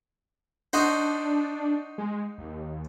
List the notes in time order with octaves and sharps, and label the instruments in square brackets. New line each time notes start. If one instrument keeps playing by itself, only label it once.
[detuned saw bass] D4 [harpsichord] D#4 F#4 C5
[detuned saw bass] G#3
D#2